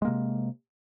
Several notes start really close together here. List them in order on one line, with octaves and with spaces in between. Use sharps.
G#3 A#3 C3